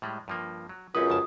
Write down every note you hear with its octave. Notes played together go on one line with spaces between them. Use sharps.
A2 G3 G#3
G2 F3 A#3
F#3
C#2 F#2 C4 C#4 B4 D#6
F2 C#3 A5